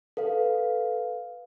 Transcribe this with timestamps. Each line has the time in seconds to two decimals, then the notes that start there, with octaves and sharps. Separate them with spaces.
0.17 A4 B4 F5